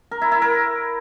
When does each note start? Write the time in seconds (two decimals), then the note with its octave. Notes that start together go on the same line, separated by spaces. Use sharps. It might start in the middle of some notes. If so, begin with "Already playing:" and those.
0.11 A#4
0.21 E4
0.32 E4
0.42 A#4